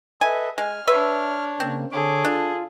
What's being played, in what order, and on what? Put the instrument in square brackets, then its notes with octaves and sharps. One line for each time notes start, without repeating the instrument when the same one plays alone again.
[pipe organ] A4 B4 D#5 [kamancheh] E5 [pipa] G#5
[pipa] G#3 [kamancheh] G#5 [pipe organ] F6
[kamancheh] D4 C#5 [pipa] B4 E5
[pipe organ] C#3 A#3 [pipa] C4
[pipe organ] D3 C#5 D6 [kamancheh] G#4 A4
[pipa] D4 [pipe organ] F4